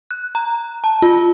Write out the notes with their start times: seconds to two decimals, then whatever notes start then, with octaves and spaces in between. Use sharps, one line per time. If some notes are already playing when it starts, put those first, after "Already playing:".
0.11 F#6
0.35 A#5
0.84 A5
1.02 F4